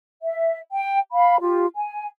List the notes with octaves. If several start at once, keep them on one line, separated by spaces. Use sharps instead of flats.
E5
G5
F5 B5
F4 G4
G#5